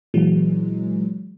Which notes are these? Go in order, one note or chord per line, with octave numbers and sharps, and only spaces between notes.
A#2 E3 F#3 G#3